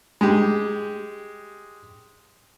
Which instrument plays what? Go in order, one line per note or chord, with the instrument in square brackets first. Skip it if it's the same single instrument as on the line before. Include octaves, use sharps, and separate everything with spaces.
[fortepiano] G#3 G4